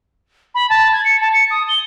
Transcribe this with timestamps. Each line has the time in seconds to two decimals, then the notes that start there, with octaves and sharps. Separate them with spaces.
0.55 B5
0.70 A5
0.93 G#6
1.05 C#7
1.21 A5
1.33 C#7
1.51 D#6
1.69 G7